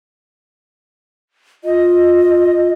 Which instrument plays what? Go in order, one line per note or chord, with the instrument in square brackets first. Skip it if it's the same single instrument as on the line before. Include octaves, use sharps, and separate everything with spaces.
[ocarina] F4 [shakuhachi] D#5